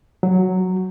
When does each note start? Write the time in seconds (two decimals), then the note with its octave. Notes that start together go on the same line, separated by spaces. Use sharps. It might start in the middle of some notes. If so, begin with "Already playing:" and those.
0.23 F#3